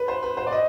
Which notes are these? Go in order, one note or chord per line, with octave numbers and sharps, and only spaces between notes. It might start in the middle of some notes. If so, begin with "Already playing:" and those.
Already playing: B4
C5
B4
C5
D5
D#5